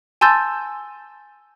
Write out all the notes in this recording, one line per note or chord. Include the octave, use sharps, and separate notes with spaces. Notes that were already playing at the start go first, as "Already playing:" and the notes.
G#5 A5 C6 E6 G6 A6